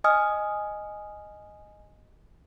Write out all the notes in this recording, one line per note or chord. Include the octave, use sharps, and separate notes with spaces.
D#5 G#5 D#6 F6